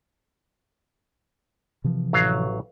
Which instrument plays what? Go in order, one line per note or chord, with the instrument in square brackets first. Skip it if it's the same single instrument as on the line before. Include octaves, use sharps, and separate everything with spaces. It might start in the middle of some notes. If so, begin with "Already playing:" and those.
[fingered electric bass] C3 E3 F3
[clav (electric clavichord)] A1 F#3 F5